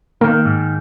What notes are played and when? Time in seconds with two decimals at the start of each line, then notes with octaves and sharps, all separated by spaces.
0.21 D#3 A#3
0.45 G#2